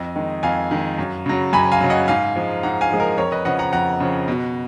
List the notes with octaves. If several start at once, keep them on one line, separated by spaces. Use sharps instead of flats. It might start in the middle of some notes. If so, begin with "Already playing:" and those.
Already playing: F2 D#5
D#3 G#3
F2 F5 G#5
D#3 G#3
F#2
C#3 F#3
F#2 G#5 B5
F5 G#5
C#3 F#3
D#5 F#5
G#2 F5 G#5
F3 G#3
G#2 F#5 A#5
F5 G#5
F3 G#3 G#4
A#4
F2 A#4 C#5
B4 D#5
C#3 F3 D#5 F#5
F#5 A#5
F2 F#5 A#5
C#3 F3
B2